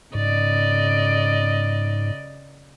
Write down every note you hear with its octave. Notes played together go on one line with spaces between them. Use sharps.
G#2 C#3 D5 D#5